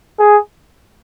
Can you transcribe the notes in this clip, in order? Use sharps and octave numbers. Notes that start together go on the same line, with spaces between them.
G#4